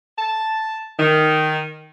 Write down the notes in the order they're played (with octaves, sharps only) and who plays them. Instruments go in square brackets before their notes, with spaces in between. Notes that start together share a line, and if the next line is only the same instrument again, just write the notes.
[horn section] A5
D#3